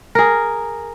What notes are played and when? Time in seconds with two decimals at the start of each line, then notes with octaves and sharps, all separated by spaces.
0.15 G#4 A#4